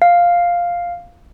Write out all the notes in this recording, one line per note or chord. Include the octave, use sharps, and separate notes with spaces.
F5